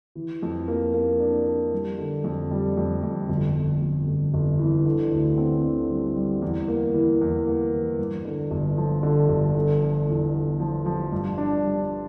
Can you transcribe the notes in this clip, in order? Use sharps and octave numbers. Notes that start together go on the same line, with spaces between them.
E3
F2
A#3
A#3
D4
D4
G3
D3
F2
G3
F2
F2
G1
G1
F2
G1
G1
E3
D3
D2
C4
D3
G3
G3
E2
A#3
E3
E2
A#3
E3
G2
D3
G1
F3
D3
G1
D3
F3
E2
D3
F3
F3
G2
D4
G3